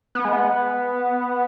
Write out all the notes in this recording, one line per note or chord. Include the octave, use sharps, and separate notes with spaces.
B3
G#3
B3